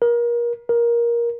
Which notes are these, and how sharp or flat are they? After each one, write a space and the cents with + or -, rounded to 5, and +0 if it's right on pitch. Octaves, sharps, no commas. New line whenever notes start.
A#4 +30
A#4 +15